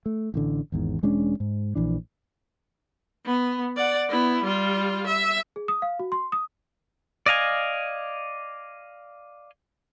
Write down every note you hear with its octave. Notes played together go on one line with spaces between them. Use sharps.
A3
A1 A2 D3
G#1 E2 G#2
E1 G#3 C#4 D4
G#2
A#1 E3 D4
B3
D5 F#5
B3 E4
G3 F4
E5
G#4
D#6
F5
F#4
C6
D#6
D5 D#5 F5 G#5